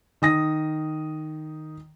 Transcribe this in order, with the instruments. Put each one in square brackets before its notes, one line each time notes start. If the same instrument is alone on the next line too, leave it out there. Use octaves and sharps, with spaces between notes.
[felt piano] D#3 D#6 A#6